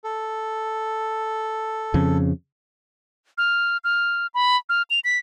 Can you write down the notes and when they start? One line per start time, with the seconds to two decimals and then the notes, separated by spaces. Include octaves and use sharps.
0.04 A4
1.94 F2 C#3
3.38 F6
3.84 F6
4.34 B5
4.69 F6
4.90 F7
5.04 B6